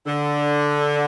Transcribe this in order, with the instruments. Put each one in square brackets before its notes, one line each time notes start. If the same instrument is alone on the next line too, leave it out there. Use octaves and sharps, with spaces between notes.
[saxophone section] D3